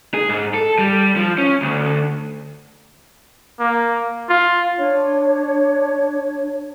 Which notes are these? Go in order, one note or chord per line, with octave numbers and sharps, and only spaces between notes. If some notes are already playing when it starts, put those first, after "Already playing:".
G#4
G#2
A4
G3
F3
C#4
D2
A#3
F4
D4 C#5